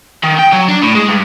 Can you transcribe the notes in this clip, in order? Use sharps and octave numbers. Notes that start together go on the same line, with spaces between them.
D#3
G5
F#3
D4
A2
G#3
G2